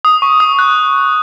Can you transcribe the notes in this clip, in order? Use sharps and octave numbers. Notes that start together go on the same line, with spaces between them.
D#6
C#6
D#6
F#6